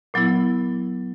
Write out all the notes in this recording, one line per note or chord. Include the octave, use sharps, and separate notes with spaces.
A#2 F#3 B3 E4